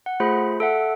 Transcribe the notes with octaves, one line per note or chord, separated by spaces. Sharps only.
F#5
A3 F4 G#4 C5 B5
A4 E5 F#5